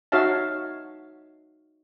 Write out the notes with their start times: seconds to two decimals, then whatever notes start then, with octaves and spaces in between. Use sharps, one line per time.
0.12 D#4 F#4 C#5 E5 F5 A5